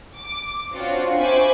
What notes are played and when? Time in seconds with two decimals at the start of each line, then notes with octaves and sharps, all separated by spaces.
0.16 D6
0.73 C4 D4 F4 F#4 C#5
1.17 C5 E5 G#5 B5 C#6 D6